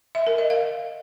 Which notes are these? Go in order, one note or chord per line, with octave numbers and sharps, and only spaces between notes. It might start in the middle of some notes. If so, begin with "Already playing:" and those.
E5
A#4
D#5
F5